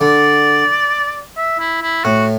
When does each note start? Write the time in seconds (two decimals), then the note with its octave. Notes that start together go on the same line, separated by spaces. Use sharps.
0.01 D3 D5
1.37 E5
1.59 E4
1.82 E4
2.04 A2 F#4